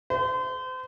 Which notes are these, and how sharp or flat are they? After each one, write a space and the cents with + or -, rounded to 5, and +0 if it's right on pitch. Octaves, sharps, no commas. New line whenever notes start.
C5 -35